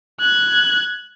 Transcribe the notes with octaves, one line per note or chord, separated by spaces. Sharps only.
F#6 G#6